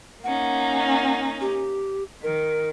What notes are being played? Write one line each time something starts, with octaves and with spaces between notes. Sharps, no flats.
A#3 C#4 D#4 F#5
G4
D#3 A#4